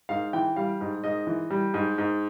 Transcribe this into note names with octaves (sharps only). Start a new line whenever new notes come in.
G#2 F5
E3 G5
G3 F5
G#2
G#2 D#5
E3
G3
G#2
G#2